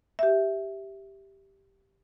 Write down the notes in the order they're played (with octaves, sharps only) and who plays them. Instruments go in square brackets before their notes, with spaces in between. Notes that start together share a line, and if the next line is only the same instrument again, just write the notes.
[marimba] G4 E5